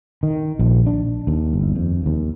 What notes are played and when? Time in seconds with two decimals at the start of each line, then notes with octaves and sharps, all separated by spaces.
0.23 D#3
0.59 A#1
0.86 D4
1.27 D#2
1.54 G1
1.76 F2
2.06 D#2